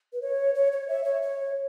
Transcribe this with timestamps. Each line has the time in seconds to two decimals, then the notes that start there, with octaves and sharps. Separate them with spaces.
0.13 B4
0.22 C#5
0.55 C#5
0.72 C#5
0.88 E5
1.04 C#5
1.22 C#5